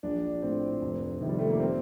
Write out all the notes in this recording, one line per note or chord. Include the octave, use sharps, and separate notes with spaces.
A#1 D4
A2 C4
F1
F2 C3 D#3
G3
A3
A#3
C4